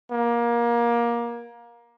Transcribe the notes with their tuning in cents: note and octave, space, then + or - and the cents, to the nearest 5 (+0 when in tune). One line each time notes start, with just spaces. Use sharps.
A#3 +20